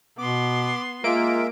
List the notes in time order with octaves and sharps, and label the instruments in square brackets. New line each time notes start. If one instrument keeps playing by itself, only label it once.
[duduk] B2 [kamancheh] B3 C6 [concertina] D6
[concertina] G#3 E5 [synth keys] A#3 D7 [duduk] F4